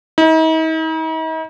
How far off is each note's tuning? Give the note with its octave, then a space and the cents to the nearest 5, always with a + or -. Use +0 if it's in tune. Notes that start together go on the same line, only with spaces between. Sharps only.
D#4 +45